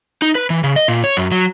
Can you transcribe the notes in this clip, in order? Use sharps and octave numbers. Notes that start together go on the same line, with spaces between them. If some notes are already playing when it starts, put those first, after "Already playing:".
D#4
B4
E3
C#3
D#5
A#2
C#5
F#2
F#3